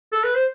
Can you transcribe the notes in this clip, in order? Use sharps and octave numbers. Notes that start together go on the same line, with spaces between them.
A4
B4
C5